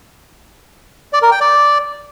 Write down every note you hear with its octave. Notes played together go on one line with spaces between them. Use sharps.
D5
A#4
G5
D5